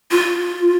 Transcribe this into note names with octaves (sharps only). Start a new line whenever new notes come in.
F4